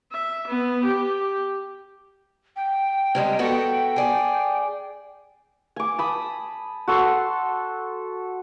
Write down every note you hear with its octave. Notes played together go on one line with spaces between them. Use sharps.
E5
B3
G4
G5
C3 G3 G#3
B3 F#4 A4
G#4 D5
G#5 D6
A5 B5 D#6
F#4 A4 A5 C6